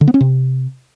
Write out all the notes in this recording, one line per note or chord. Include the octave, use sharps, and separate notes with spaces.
D3
B3
C#4
C3